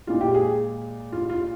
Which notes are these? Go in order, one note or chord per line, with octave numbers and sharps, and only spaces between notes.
A#2 G#3 F4
G4
G#4
F4
F4